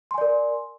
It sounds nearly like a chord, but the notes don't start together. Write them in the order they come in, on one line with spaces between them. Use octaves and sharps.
C6 G#5 D5 A#4